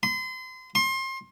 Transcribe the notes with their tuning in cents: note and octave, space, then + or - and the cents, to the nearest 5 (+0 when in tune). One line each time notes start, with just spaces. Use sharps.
C6 -35
C6 +30